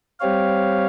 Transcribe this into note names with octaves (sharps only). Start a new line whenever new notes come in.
G3 C4 G4 C#5 F5